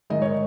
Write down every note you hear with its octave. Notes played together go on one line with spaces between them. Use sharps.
G#2 D#3 G#3 D#5
C#5